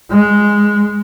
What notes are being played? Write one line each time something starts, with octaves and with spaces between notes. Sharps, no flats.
G#3